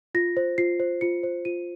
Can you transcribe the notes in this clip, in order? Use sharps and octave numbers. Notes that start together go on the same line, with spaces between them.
F4 A#6
C5
F4 C7
C5
F4 C#7
C5
F4 D#7